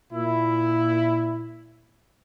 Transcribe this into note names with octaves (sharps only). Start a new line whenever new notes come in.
A#2 E4